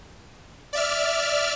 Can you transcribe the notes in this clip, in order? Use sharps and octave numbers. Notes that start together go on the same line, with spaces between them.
D5 E5 F6